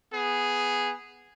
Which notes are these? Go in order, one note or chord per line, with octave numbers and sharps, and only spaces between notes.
B3 G#4